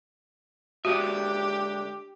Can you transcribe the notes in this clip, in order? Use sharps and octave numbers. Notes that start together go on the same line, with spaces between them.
D3 G#3 F#4 G4 E5